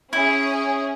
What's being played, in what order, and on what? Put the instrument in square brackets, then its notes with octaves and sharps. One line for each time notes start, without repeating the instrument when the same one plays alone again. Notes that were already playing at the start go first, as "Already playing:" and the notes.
[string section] C#4 G#4 [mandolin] E4